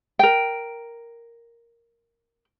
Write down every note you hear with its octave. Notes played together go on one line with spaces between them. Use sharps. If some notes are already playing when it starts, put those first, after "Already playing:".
A#4 G5